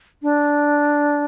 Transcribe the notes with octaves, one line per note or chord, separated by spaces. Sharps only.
D4